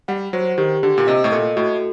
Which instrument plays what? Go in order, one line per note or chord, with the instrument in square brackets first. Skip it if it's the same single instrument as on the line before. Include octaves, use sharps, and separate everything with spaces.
[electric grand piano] G3 [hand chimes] F#5
[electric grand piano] F#3 [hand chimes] C5
[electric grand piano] D#3 [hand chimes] G4
[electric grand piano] D3 [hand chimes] G4
[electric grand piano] A#2
[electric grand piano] C3 [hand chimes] D#5
[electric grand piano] A2
[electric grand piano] A#2 [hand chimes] A4
[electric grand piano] A2 [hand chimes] F#4